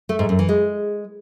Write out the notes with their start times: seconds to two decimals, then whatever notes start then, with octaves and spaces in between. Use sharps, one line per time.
0.09 A3
0.19 G#2
0.29 F#2
0.39 E3
0.49 G#3